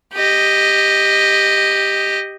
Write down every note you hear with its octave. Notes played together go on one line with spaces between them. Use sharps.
G4 D#5